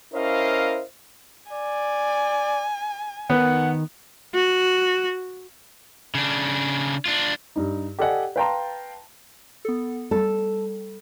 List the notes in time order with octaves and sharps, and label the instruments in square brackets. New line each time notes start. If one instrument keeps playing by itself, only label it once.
[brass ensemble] C#4 E4 A#4 C5 D#5 F5
[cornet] D5 [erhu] G#5
[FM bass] D#3 [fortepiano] B3 [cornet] F#5
[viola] F#4
[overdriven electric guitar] C#3 D4
D4 F4
[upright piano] G2 D#4
G4 A4 D5 D#5 F#5 G#5
B4 F5 G5 A5 A#5 C6
[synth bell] B3 A4
[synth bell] G3 [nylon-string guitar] A4